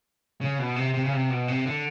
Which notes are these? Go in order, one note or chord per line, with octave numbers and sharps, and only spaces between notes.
C#3
B2
C3
C3
C#3
C3
B2
C3
D3